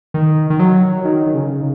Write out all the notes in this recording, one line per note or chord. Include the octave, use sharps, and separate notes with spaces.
D#3
D#3
F#3
D#3
D#3
C#3